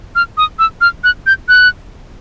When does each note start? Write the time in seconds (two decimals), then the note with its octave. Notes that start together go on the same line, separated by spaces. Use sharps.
0.15 F6
0.37 D#6
0.59 E6
0.81 F6
1.04 F#6
1.26 G6
1.48 F#6